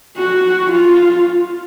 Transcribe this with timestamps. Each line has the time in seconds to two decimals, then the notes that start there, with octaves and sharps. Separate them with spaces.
0.17 F#4
0.72 F4